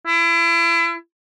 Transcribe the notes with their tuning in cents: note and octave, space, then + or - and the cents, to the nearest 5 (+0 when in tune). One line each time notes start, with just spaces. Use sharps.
E4 +35